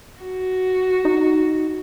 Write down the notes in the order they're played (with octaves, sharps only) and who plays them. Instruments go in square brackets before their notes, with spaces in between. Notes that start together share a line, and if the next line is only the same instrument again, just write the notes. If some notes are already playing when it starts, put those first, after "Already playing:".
[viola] F#4
[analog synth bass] D#4